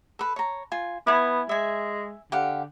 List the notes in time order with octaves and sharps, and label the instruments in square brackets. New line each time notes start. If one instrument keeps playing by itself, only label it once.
[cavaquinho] A4 B4
C#5 A#5
F4 G#5
[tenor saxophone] B3 [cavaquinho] E4 G#5
[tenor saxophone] G#3 [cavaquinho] E5 G#5
[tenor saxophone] D3 [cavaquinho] G4 F5 F#5